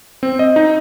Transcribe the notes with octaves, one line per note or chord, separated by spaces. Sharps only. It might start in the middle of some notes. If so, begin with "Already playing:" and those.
C4
D#5
D#4